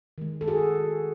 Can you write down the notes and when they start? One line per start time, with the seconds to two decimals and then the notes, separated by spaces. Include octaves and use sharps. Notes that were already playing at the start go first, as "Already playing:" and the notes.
0.18 D#3 G#3
0.41 A4
0.48 F#4 G#4